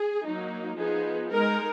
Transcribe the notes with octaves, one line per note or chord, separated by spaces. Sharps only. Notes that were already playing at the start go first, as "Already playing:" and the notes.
Already playing: G#4
F#3 A#3 D#4
F3 B3 D#4 G#4
G#3 D#4 A#4